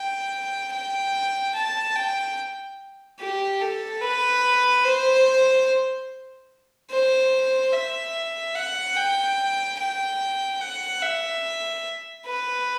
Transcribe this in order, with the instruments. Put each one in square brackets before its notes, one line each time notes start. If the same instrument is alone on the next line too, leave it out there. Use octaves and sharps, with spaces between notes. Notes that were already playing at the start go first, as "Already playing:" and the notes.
Already playing: [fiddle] G5
G5
A5
G5
G4
A4
B4
C5
C5
E5
F#5
G5
G5
F#5
E5
B4